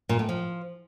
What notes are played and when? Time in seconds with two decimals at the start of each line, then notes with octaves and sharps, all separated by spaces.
0.09 A#2
0.19 A2
0.29 F3